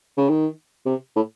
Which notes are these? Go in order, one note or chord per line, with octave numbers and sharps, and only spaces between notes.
C#3
D#3
C3
A2